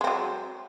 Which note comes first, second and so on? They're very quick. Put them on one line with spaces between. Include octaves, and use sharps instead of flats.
G#3 C4 F#3